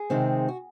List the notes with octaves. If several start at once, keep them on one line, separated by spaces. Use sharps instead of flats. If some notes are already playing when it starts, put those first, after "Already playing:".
Already playing: G#4
C3 D#3 G#3 C4
F#4